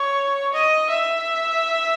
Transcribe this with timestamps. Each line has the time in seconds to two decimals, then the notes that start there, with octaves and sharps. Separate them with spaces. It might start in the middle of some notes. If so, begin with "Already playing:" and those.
Already playing: C#5
0.53 D#5
0.90 E5